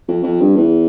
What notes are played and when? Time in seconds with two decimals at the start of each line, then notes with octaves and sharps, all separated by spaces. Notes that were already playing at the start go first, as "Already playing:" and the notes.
0.08 F2
0.23 F2
0.40 G2
0.56 E2